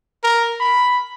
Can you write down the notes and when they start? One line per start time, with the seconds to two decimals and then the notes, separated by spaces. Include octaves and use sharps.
0.23 A#4
0.61 B5